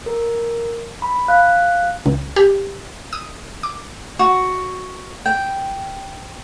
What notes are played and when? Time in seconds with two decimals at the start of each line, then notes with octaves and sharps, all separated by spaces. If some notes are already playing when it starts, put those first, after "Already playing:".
0.06 A#4
1.02 B5
1.28 F5 F#6
2.06 C#2
2.36 G4
3.13 D#6
3.63 D6
4.19 F#4
5.26 G5